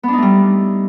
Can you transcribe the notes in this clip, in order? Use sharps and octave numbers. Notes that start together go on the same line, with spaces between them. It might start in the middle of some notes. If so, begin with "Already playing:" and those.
G3 A3 B3 D4 D#4